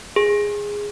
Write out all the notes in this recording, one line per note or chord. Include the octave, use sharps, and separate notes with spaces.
G#4